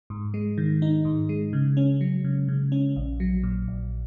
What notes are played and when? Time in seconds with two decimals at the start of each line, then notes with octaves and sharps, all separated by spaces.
0.10 G#2
0.34 G#3
0.58 D#3
0.82 D#4
1.05 G#2
1.29 G#3
1.53 C#3
1.77 C#4
2.01 F#3
2.24 C#3
2.48 C#3
2.72 C#4
2.96 A#1
3.20 F#3
3.43 A#2
3.68 A#1